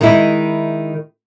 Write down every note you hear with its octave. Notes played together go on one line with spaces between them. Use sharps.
D#3 G#3 D#4 E4